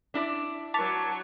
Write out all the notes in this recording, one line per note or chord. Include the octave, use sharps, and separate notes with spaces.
D4 E4 D5
F#3 A5 C#6 D6 B6 F7